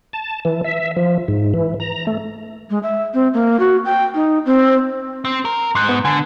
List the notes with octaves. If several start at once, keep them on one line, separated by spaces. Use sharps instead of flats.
A5
E3
E5
F3
G#2
E3
A#5
A3
G#3
E5
C4
A#3
F#4
G5
D#4
C4
C4
A#4
G#2 C6 F#6
B3
D3 G#5